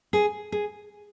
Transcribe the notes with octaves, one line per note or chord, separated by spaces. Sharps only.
G#4
G#4